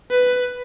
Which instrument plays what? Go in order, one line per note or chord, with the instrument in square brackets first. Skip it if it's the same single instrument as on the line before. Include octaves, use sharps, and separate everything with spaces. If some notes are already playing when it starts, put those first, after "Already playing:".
[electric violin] B4